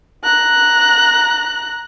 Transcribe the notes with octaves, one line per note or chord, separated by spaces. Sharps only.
A#5 F#6